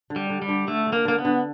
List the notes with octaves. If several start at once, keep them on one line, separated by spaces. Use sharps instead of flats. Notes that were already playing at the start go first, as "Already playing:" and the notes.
D3
G3
D3
G3
D3
D3 A3
D3
A#3
D3 A#3
B3
D3